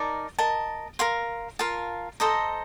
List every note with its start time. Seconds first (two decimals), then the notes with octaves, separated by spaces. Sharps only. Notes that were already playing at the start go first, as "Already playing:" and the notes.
Already playing: D#4 A#4 D5 A5
0.39 A#4 D#5 A5
0.99 A#4 F5 C6
1.59 F4 A#4 F5 A5
2.20 A4 C5 D#5 A#5